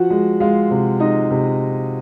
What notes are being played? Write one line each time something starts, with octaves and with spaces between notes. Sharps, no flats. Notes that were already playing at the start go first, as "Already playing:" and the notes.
Already playing: F3 F#4 F#5
G#3
G#3 F4 F5
C3
G#3 D#4 D#5
C3